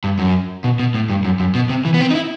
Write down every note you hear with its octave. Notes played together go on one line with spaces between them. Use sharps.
G2
F#2
B2
B2
A2
G2
F#2
F#2
B2
C3
E3
B3
C4
D#4
E4